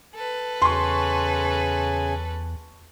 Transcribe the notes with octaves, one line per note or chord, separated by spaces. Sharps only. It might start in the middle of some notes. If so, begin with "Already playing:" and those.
A4 B4
E2 C#3 G#5 C6 C#6